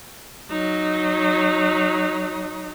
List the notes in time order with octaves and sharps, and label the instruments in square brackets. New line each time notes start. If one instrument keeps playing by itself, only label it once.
[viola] F#3 D#4